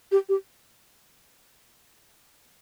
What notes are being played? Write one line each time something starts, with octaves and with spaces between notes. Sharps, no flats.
G4
G4